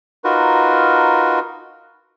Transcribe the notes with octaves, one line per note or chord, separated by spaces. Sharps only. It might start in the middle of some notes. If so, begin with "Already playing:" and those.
D#4 F4 F#4 A#4 B4